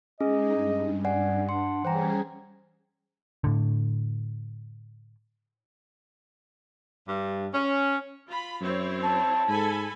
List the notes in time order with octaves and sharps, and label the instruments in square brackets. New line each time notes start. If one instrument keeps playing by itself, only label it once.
[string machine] G#3 D#4 [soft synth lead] C#4 [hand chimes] G#4 [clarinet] D#5
[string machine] G2
[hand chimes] D5 F#5 G#5
[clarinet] D4 [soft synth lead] F#5 [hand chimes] C6
[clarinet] E3 [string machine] G3 C#4 G#4 [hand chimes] C5 G5 A#5
[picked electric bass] A2 D3
[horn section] G2
C#4
[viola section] F4 B5
[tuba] F#2 [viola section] C4 E4 C#5
[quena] A5
[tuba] G#2 [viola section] A4 G#5 B5